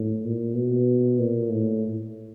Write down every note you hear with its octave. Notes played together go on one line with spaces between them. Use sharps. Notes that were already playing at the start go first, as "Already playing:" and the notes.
Already playing: A2
A#2
B2
A#2
A2